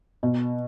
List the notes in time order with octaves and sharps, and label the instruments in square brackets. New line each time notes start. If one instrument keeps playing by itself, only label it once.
[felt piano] B2